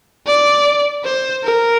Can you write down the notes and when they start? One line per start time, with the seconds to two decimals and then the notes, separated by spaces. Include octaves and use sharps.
0.27 D5
1.04 C5
1.44 A#4